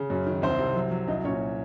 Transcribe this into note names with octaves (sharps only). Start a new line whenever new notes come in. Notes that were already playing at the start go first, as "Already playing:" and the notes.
Already playing: C#3
F#2
D#3
C2 C4 C5
C3
F#3
F#3
C2 D#4 D#5
A#2 C#4 C#5